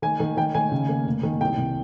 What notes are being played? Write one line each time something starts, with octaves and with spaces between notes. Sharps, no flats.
D#3 G#5
D#3
D#3 G5
D#3 G#5
C#3
A#3
F1
D#3
C2 G5
C2